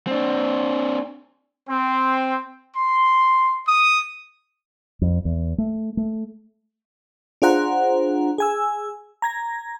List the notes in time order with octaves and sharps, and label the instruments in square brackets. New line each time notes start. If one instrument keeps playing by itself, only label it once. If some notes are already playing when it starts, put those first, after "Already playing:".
[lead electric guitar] C4 D4
[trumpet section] C4
C6
D#6
[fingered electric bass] F2
E2
A3
A3
[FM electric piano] D4 F4 G#4 C5 F#5 A#5
G#4 G#5 E6
A#5 G#6 A#6